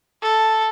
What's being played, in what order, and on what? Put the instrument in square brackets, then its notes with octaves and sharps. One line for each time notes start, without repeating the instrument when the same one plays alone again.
[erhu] A4